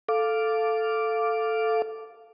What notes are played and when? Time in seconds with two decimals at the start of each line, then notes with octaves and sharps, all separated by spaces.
0.09 A4 F5 D6